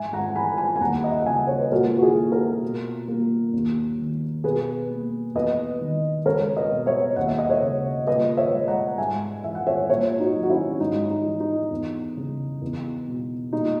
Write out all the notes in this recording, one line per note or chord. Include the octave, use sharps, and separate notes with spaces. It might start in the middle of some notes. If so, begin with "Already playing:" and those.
Already playing: G#2 E5 G#5
F#5 A#5
E3 G#5 B5
G#5 B5
G#5
D#2 F#5 A#5
D#5
E5
F#5
C#3 E5 G#5
C#5
B4
A#2 F#4 A#4
F#4
E4 G#4
A#3
F#4 A#4
B2
A#3
D#2
D#3
B2 G#4 B4
A#3
E2 B4 D#5
D#3
C#2 A#4 C#5
B4 D#5
B2
C#5 E5
D#2 F#5
E5
D#5
C#5 E5
C#3
A#2 B4 D#5
C#5 E5
G#3
F#5 A#5
G#2 E5 G#5
E3 E5
F#5
C#5 E5
A#2 C#5 E5
D#4 F#4
F#3
F#4
C#4 E4
G#2 D#4
D#4
E3
D#4
E2
C#3
E2
B2
A#2 D#4